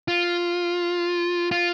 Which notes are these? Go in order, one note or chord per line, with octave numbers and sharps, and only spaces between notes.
F4
F4